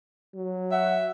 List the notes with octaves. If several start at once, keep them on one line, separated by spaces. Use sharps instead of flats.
F#3
E5 F#5